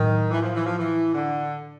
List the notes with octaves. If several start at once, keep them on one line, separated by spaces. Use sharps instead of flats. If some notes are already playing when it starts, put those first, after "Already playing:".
Already playing: A2 D#3 F#3
E3
F3
E3
F3
E3
D3